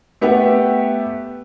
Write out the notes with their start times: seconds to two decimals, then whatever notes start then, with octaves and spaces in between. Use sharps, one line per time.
0.21 A3 B3 G4 E5 F#5